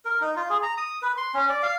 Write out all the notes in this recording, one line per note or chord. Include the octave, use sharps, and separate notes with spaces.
A#4
D#4
F4
G#4
A#5
D#6
B4
C6
C#4
D5
F5